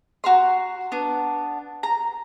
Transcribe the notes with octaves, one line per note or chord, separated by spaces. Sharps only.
F#4 A#5 C6
B3 D4
A#5